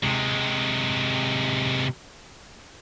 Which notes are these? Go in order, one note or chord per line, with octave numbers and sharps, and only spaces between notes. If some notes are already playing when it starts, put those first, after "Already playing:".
C3 G#3